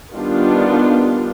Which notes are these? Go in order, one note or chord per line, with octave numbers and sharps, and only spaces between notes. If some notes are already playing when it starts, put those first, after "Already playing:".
D#3 G3 B3 D4 F4